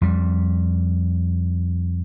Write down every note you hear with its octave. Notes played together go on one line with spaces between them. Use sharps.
F2 G3